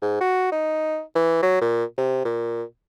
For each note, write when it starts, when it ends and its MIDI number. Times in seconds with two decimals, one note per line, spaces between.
0.02 0.20 44
0.21 0.49 66
0.52 1.01 63
1.16 1.40 52
1.43 1.58 54
1.61 1.85 46
1.98 2.22 48
2.25 2.63 46